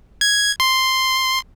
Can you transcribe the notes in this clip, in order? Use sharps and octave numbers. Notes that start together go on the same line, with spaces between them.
G#6
C6